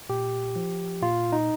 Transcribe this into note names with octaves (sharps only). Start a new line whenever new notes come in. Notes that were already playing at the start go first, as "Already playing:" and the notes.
A#2 G4
F3
A#2 F4
D#4